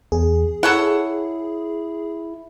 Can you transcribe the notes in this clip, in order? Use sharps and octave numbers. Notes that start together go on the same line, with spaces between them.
E2 G#4
E4 A4 C#5 F#5